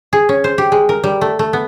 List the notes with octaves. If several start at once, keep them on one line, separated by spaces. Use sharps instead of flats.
G#4
C#4
C5
G4
G#3
A#4
G3
A3
A3
B3